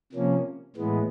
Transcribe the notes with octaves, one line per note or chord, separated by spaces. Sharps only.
C3 F3 A#3 C#4
A2 E3 G#3 B3